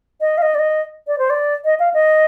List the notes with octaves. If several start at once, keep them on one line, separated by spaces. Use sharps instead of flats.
D#5
F5
D#5
D5
D#5
D5
C5
D5
D#5
F5
D#5